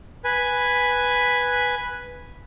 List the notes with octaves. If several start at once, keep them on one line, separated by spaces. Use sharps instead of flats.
B4 G#5